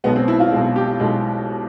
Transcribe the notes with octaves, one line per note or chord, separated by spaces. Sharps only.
B1 B2 G#3 B3
C4
E4
F4
B1 B2 G#3
G4
B1 B2 G#3